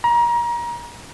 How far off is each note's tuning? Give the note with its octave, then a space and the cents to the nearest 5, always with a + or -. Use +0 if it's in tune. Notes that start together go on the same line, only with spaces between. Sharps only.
A#5 +30